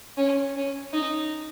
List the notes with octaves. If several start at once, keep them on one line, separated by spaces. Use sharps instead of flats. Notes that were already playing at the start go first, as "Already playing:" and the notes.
C#4
C#4
D#4